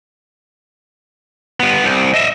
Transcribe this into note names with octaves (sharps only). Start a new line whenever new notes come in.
G2 B3
C2
D#5 E5